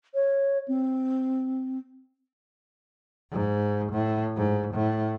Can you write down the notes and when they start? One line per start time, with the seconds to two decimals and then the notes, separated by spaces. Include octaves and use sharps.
0.14 C#5
0.68 C4
3.32 G#2
3.92 A2
4.37 G#2
4.74 A2